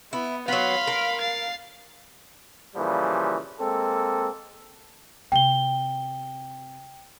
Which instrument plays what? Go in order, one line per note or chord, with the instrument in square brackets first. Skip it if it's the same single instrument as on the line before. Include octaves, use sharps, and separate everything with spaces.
[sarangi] B3 [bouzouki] E4
[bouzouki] F#3 B3 [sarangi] F5 [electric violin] B5 C6
[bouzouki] A#4
[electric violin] A6 C7
[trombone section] A#2 C#3 E3 F3 G3
G#3 A#3 C4 A4
[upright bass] C3 [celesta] G5 G7